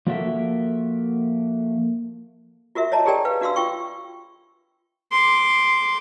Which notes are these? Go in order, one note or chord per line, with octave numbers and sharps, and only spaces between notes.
F3 A#3 F#4 A4 A#4 E5
F4 F#4 A#4 E5
C#5 D#5 A5 A#5
G4 G#4 A#4 D5 G5 G#5
B4 F5
D4 F#4 F5 C6 E6
F4 G5 C#6
C6 D6